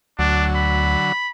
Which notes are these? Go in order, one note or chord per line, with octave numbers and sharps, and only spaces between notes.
D2 D3 F#3 D4
B5